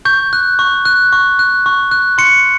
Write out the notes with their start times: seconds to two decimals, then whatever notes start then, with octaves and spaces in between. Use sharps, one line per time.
0.05 C#6 G6
0.33 F#6
0.59 C#6
0.85 F#6
1.12 C#6
1.39 F#6
1.66 C#6
1.91 F#6
2.18 C6 C#7